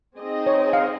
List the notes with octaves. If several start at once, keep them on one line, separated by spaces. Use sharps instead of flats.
C4 D#4 G#4 D#5
C#5
F5